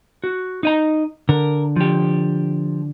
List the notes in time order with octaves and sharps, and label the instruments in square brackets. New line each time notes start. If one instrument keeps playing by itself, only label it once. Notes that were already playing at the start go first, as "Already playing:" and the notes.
[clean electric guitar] F#4
D#4 D#5 A#5
[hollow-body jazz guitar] D3 [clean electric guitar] A#4
[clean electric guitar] F3 G4